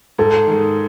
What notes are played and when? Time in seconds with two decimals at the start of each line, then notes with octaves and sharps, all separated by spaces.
0.18 G#2 A4
0.47 D#3 G#3